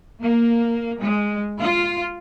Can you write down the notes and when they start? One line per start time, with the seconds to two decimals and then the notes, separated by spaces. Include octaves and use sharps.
0.20 A#3
0.99 G#3
1.61 F4